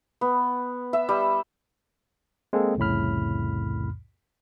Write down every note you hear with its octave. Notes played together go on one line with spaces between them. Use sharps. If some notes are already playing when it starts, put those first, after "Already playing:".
B3
E5
G3
G#3 A#3 C4 G#4 A4
C2 F2 A2 C#3 B5 F6